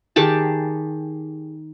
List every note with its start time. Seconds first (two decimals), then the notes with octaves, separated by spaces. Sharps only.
0.16 D#3 G4 G#4 A5